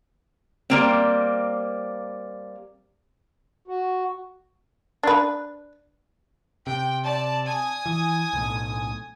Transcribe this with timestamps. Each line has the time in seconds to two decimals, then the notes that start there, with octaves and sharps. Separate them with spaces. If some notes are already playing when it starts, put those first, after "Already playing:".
0.70 G3 A#3 C4
3.68 F#4
5.03 D4 B4
6.67 C3 G5
7.04 D5 A5
7.45 G#5 D#6
7.86 E3
8.33 B1 A2